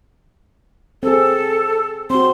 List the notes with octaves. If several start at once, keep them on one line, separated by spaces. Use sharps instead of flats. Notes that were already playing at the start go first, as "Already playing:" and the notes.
C4 G#4 A4
C4 F#4 C6